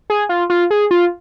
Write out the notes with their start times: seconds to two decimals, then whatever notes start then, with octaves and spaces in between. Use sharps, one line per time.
0.10 G#4
0.29 F4
0.50 F4
0.71 G#4
0.91 F4